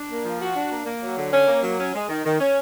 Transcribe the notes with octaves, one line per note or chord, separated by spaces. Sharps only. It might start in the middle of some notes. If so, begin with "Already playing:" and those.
Already playing: D4
A#3
F3
F#4
D4
A#3
A#3
F#3
D3
C#4
A#3
F#3
C#4
G#3
D#3
D#3
C#4